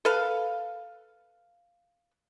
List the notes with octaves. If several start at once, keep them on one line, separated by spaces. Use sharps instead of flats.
A4 B4 F5